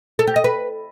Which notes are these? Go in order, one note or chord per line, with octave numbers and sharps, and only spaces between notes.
A4
G4
D#5
B4